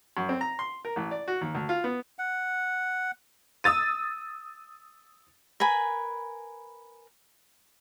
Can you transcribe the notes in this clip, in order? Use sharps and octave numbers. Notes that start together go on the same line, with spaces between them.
F#2
C4
A#5
C6
A#4
A1
D5
F#4
D#2
D2
F4
B3
F#5
D#6 E6 A6 D#7
A#4 B4 G#5 B5